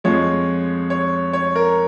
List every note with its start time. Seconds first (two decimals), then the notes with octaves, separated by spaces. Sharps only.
0.04 F2 F3 G#3 C#5
0.90 C#5
1.33 C#5
1.55 A#4